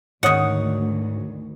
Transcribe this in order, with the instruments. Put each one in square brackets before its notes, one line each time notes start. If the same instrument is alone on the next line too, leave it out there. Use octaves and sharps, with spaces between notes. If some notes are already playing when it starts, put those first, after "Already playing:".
[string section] D2 [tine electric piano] G#2 [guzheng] D#3 F#5 [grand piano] C#5 D#6